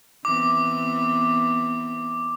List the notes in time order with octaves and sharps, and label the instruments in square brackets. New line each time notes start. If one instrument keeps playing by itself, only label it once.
[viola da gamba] E3 B3 C4 [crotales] D6